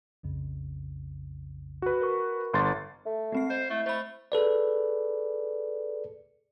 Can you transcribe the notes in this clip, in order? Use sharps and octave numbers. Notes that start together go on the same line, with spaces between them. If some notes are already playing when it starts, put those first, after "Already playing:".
B1 F2 C#3
F#4 B4
A#4 C#6
G1 C6 A6
A3
G#3 C4 C7
C5 D#5
A3 E4
A3 C5 B5
G#4 A4 B4 D5